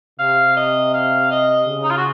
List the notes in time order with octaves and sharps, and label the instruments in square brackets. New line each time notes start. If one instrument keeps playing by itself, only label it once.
[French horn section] C3 [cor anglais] F5
[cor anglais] D#5
F5
D#5
[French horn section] C#3
[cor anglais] D#4
F4
F#4